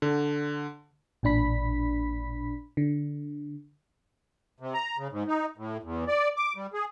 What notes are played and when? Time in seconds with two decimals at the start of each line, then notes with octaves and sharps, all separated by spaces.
0.02 D3
1.23 A1 A#2 D4 B5 B6
2.77 D3
4.60 C3
4.74 A#5
4.98 C#3
5.12 G#2
5.28 D#4
5.57 A2
5.83 E2
6.08 D5
6.37 D6
6.56 G3
6.74 G#4